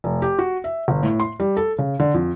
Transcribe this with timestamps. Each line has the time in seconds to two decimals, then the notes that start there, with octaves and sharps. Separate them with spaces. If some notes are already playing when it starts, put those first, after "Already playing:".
0.04 F1
0.22 G4
0.39 F#4
0.64 E5
0.88 G1
1.03 A2
1.20 C6
1.40 G3
1.57 A4
1.78 C#3
2.00 D3
2.14 F2